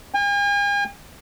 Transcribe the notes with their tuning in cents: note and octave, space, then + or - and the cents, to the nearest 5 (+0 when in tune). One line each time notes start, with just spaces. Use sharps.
G#5 -45